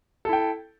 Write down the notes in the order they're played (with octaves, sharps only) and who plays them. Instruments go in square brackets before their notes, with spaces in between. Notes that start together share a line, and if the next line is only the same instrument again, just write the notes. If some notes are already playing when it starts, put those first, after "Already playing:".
[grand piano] A4
E4
G5